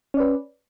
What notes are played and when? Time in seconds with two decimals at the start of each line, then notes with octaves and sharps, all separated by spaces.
0.14 C#4
0.17 D5
0.20 B4